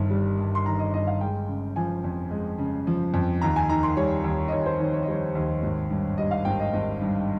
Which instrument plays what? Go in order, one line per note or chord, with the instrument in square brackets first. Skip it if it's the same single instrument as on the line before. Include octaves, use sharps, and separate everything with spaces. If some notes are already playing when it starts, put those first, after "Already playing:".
Already playing: [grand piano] G1 G2 D#3
G3
G2
C6
D#3 A#5
D#5
G1 D#5
F5
G#3 G5
C#3
F3 G#5
F2
G#3
C#3
F3
F2
D#2 A#5
G#5
D#3 A#5
C6
G3 C#5
D#2
D#5
D#2 C#5
C5
D#3 C#5
C#5
D#5
G3 C#5
D#2
G#1
G2
G3 D#5
F5
G#1 G5
D#5
G#1 D#5
G2